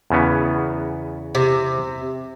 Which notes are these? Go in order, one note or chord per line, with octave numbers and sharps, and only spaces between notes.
E2 C#3 B3
C3